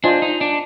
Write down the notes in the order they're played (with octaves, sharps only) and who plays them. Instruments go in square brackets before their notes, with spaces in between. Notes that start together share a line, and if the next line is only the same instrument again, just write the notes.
[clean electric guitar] D4 [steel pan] F4 C5 D#5 G#5
[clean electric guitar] D#4
D4